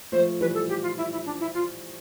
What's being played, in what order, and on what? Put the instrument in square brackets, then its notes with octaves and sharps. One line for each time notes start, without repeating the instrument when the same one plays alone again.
[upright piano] F3 A3 [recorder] C5
[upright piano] E3 G3 [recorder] B4
[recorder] A4
G4
F4
E4
E4
D4
E4
F4